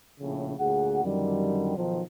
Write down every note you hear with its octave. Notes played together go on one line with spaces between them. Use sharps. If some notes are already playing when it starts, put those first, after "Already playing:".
A#1 A2 C#3
D2 A#2 G#4 F#5
F#2 D3 D#3 G3
B1 D#3 F3